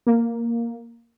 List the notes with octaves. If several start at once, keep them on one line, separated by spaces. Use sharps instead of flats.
A#3